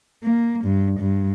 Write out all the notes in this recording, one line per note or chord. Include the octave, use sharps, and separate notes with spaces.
A#3
G2
G2